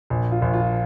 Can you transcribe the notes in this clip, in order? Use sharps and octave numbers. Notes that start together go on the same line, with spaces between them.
A#1
F4
A#1
F4